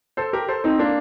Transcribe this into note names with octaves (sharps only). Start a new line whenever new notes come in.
A4 C5
G4 A#4
A4 C5
C4 D#4
A#3 D4